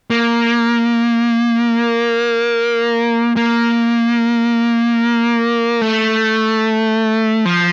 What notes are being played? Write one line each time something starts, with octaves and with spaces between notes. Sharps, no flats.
A#3
A#3
A3
F3